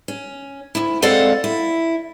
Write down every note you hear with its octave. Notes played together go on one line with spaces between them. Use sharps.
C#4
D2 E4
G#3 C4 A4 D5 F5 F#5
E4